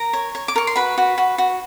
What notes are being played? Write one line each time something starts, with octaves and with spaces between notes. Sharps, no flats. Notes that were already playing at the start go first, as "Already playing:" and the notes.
Already playing: A#4 A#5
C#5
C#5
D6
A#4 C#6
C6
F#4 B4 B5
F#4
F#4
F#4